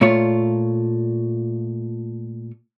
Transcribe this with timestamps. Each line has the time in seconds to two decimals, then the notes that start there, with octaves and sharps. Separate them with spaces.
0.01 A#2 A3 F4 C#5